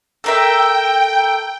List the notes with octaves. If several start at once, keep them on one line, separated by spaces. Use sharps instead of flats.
A4 A#4 E5 G5